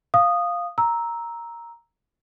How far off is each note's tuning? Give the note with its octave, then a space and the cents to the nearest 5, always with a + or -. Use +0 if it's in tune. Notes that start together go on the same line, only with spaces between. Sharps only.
F5 +0 D#6 -10
A#5 +0 E6 -10